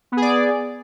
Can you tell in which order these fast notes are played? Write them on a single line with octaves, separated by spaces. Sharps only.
B3 G#4 D5